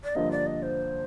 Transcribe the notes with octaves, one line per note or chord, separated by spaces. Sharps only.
D5
G2 D3 F3 A#3 D#5
D5
D#5
C5